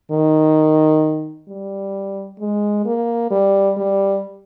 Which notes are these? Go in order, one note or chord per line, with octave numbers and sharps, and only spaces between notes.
D#3
G3
G#3
A#3
G3
G3